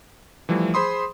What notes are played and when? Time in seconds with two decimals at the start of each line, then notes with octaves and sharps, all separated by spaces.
0.49 E3 F3 G3 A3
0.74 G#4 C5 B5 C6 D#6